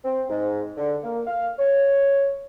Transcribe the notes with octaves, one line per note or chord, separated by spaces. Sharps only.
C4
G#2
D3
A#3
F5
C#5